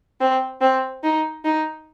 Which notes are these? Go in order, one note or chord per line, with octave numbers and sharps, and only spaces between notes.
C4
C4
D#4
D#4